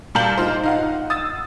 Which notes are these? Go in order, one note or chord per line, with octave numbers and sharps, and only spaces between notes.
A#2 G3 F5 A5 G6 F#7
D#4 F4 C5
D#4 F5 F#5
D#6 E6 A6